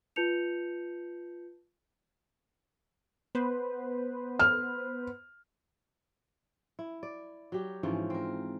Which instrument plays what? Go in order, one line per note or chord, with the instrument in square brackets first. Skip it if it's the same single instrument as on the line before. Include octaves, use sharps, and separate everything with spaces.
[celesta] F4 B4 A5 G6 C#7 F7
[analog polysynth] B3 B4 C5
[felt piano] F6
[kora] E4
D5
F#3 G4
G#2 E3 F3 C#4
C4 A#4